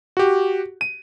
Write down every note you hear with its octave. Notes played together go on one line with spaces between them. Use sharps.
F#4 G4
D#7